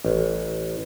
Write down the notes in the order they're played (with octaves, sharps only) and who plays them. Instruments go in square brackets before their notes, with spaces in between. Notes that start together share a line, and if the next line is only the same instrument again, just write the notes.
[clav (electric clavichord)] A1